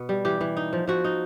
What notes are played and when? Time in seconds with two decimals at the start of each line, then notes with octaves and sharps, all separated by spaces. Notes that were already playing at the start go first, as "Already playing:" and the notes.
Already playing: B2 B3
0.09 G3
0.25 E3 G4
0.41 E3
0.57 D#4
0.73 F3
0.87 F3 F#4
1.04 D#4